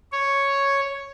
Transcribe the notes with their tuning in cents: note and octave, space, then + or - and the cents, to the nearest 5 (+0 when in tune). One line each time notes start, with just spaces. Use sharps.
C#5 +0